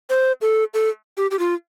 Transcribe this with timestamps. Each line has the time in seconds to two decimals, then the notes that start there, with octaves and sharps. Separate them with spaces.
0.10 C5
0.42 A4
0.74 A4
1.17 G4
1.31 G4
1.39 F4